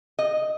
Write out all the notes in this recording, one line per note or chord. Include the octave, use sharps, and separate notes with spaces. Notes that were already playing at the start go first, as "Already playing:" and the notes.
D#5